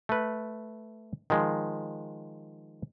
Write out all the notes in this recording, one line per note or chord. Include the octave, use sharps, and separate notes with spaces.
A3 B4
D#3 F3 G#3